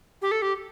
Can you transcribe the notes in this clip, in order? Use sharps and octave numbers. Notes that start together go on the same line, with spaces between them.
G4
A4
G4